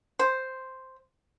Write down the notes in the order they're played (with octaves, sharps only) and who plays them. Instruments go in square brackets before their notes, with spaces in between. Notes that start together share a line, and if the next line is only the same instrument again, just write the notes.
[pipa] C5